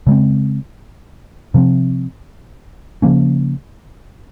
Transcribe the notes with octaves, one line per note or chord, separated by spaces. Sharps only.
C#3 G#3 C4
C3 F3 C4
C#3 F3 A#3 C#4